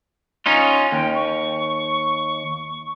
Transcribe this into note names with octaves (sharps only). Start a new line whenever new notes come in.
C#4 D#4 F4
D#2 G5
C#6